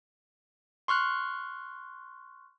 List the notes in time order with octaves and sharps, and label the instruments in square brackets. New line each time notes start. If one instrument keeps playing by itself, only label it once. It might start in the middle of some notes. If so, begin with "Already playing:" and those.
[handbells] C6 C#6 F6 F#6